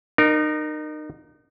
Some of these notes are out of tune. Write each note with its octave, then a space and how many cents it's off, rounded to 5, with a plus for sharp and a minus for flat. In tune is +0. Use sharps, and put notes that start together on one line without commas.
D#4 -35 A#4 +0